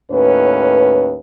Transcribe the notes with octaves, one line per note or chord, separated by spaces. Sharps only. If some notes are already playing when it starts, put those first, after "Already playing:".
D#2 A2 C#4 B4